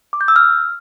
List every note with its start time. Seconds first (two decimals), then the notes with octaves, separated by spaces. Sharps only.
0.13 D6
0.21 G6
0.28 E6
0.36 F6